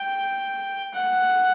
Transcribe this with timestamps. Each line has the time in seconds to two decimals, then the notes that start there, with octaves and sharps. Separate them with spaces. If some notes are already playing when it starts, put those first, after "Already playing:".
Already playing: G5
0.93 F#5